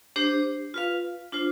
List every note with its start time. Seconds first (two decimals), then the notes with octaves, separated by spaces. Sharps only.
0.16 D4 G4 C5
0.74 F4 B4 F5
1.32 D4 F4 C5